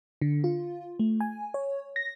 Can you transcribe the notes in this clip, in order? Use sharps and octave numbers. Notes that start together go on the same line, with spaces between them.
D3
F4
A3
G#5
C#5
A#6